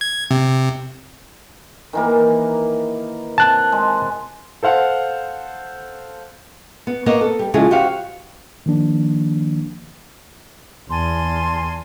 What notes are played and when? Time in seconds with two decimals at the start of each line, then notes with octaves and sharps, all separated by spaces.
0.01 G#6
0.31 C3
1.93 D#3 E3 A#3
3.38 C3 A5 F#6
3.72 G#3
4.63 A4 C5 F5 F#5
6.87 B3
7.06 A#3 B3 C#5 D#5
7.21 A4
7.39 G3
7.54 C#3 F3 G#3 E4 G#4
7.71 F#4 G4 C5 F5
8.66 D#3 F3 A#3 D4
10.90 E2 G#5 A5 C6